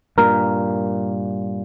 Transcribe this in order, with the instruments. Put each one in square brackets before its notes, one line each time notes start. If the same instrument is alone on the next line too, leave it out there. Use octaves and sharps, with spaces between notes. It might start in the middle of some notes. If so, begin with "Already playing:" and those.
[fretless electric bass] G2 A#2 [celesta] A#4 A#5 F6